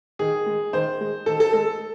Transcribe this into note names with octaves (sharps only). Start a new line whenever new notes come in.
D#3 G#4
G#3
D#3 C5
G#3
D#3 A4
A4
G#3 A4